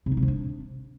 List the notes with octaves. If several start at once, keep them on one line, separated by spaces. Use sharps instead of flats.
C3
D#4
C3
F3
D4